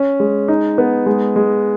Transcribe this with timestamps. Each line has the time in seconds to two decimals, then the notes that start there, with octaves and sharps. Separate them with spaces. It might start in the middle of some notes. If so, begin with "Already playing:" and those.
Already playing: C#4
0.20 G#3
0.48 D#4
0.78 B3
1.06 G#3
1.36 G#3